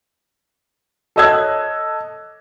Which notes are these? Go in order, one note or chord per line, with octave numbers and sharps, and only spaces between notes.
A4 C#5 D#5 E6 F#6 G#6